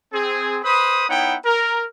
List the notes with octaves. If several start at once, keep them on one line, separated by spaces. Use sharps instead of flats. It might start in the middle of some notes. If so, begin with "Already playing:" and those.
C4 G#4
B4 C5 B5 D#6
B3 D#4 E4 C#5 F#5 G5
A#4